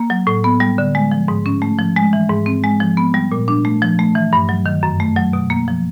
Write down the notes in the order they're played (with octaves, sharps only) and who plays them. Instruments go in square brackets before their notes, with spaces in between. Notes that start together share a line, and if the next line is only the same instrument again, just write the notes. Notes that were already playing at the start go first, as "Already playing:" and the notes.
Already playing: [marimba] A#3
F#3
A2
B3
G3
D3
G#3
F3
G#2
C#4
A3
F3
G#3
E3
G#2
C4
G#3
F3
B3
G3
A#2
D4
A3
F3
A3
E3
G2
F#3
D#3
F#2
A3
F#3
B2
A#3
F3